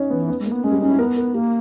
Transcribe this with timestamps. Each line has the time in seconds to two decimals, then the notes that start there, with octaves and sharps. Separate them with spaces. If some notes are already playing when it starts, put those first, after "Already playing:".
Already playing: C#4 D#4
0.10 E3 B3
0.29 B3
0.40 G#3
0.45 A#3
0.51 B3
0.63 G#3 C#4
0.72 G3
0.81 C#4 D#4
0.90 E4
0.99 B3 A#4
1.17 A#4
1.34 A#3 G4